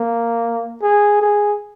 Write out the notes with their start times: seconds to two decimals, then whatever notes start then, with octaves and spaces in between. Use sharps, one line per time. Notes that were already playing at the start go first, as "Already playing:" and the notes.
Already playing: A#3
0.82 G#4
1.21 G#4